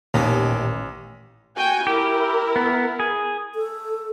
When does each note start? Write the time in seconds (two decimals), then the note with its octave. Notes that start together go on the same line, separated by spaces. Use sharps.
0.14 A1 D#2 A#2 B3 C#4 D#4 G4 A#5
1.56 F#4 G5 G#5
1.87 E4 G4 A#4
2.56 B3
3.00 G#4
3.55 A4